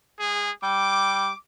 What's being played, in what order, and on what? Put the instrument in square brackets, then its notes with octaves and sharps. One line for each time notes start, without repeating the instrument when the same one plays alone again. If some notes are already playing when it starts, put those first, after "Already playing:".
[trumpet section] G#3 G#4
[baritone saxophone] G3 [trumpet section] D6